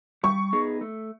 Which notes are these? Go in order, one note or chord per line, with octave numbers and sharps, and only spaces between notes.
G3 C#6
B3 D#4 G#4
A3